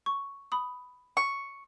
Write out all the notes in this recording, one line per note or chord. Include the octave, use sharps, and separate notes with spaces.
C#6
B5 D#6
C#6